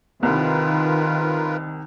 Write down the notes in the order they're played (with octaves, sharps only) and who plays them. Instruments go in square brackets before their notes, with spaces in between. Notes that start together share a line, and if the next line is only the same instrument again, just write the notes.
[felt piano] C2 [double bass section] D#3 [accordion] F4 A#4 B4